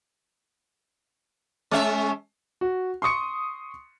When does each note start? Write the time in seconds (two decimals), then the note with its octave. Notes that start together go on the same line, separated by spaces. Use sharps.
1.71 G#3 C#4 E5
2.61 F#4
3.02 C6 C#6 D#6 C#7